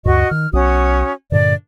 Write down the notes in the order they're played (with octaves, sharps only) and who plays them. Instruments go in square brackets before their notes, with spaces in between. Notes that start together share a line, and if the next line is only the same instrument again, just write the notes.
[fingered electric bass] D2 G2 [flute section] F#4 D#5 C#6
[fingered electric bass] D#3 [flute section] F6
[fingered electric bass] B1 [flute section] C#4 F#4 D#6
[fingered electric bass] G2 A#2 D3 [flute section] D5